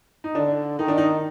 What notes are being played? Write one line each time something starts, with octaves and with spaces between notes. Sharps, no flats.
D#4
D3 D4
D#3 D#4
D4
D#4